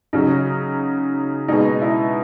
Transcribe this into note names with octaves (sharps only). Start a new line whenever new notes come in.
C#3 F#3 D#4
B2 G#3 D#4
E4